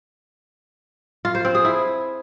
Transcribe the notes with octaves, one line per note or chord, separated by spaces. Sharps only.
F4
C5
C4
G#4
E4